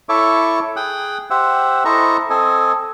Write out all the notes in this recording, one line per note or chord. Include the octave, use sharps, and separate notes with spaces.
E4 A4 C#5 E5 C#6 D6
G#4 G5 D#6 F#6
G4 C5 E5 F#5 E6
E4 A4 C5 D#5 A#5 C#6
C4 A4 D#5 G#5